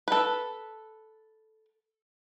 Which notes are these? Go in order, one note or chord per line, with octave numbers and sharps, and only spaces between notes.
A4 B4